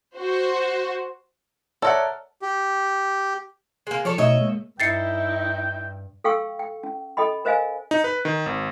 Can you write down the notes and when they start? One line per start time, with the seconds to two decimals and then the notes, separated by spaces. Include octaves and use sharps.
0.19 F#4 C5
1.82 A4 A#4 C#5 D5 E5 F#5
2.42 G4
3.87 G#3 A#3
4.05 F3 A4 C#5 D5
4.18 B2 A3 D#4 C#5 D#5 E5
4.41 G#3 A#3
4.80 G2 D#4 E4 G5 A6 C7 C#7
6.24 A4 F5 G5 C#6 E6
6.59 G5
6.83 C#4
7.17 A4 D#5 G5 B5
7.45 A#4 C5 D#5 F5 G#5
7.91 D#4
8.04 B4
8.25 D#3
8.46 G#1